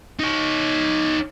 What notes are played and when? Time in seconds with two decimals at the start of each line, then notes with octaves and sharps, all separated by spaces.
0.19 D#4 C#5